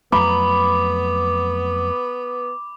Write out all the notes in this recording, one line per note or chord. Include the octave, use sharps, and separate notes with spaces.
F2 F#3 A3 B3 B5 D6